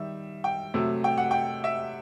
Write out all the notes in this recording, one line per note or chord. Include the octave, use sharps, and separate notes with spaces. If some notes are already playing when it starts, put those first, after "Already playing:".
Already playing: D#3 G3 E5
G5
C3 F#3 A3
G5
F#5
G5
E5